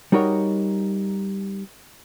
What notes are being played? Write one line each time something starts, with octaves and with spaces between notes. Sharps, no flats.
G3 D#4 F#4 A#4 C#5 D#5